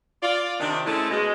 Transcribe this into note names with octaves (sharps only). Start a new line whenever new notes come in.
F4 D5
C3 D#3 D4
G#3 A3 C4 C#4 E4 A4
B2 G#3